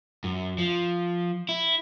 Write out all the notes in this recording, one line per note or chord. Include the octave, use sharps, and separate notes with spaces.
F#2
F3
E4